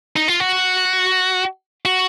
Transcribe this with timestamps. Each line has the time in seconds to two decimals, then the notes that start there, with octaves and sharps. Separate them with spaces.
0.16 D#4
0.28 F4
0.40 F#4
1.85 F#4